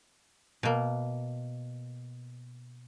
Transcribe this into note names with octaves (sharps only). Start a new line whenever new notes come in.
B2 A#3